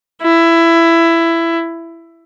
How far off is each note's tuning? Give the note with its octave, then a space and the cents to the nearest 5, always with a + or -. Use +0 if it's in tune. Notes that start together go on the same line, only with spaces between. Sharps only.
E4 +15